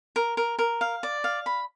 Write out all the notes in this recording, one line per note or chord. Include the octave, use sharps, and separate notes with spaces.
A#4
A#4
A#4
F5
D5
F5
B5